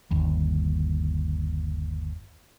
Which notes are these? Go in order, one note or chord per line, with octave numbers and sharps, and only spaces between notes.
G1 D#2